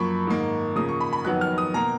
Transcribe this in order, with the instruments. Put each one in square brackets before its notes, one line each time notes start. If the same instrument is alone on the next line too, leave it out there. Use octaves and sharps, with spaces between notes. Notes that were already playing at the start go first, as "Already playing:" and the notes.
Already playing: [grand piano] F#2 F3 A#3 B5 C#6
G#2 D#3 A#3
C#3 F3 A#3 D#6
C#6
B5
B5
F2 D#3 F#3 B3 F#6
F6
D#6
B2 A#3 A#5